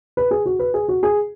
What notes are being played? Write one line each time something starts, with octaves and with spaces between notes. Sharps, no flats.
B4
G#4
F#4
B4
G#4
F#4
G#4